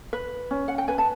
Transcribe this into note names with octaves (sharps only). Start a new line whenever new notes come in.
B4
C#4
F#5
G5
B4 G#5
A5